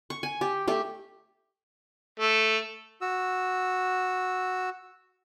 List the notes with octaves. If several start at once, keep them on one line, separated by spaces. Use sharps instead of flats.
C#6
G#5
G4
A3 G4
A3
F#4 E6